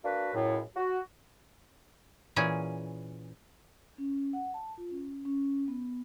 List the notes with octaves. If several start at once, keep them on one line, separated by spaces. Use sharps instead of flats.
A#3 D4 F#4 B4
C#2 F#2 A2
F#4
A#2 E3 C#4 G#4
C#4
F#5
A5
F4
C#4
C#4
B3